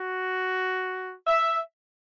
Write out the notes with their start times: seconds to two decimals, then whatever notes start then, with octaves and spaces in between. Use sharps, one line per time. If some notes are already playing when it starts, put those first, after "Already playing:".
Already playing: F#4
1.27 E5